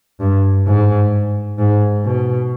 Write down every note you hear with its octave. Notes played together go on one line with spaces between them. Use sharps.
G2
G#2
G#2
B2